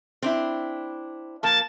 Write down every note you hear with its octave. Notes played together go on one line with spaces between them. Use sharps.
C4 D4 E4
F3 A#3 A5